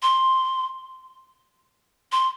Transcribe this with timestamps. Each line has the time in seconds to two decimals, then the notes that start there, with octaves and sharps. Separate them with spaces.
0.02 C6
2.12 C6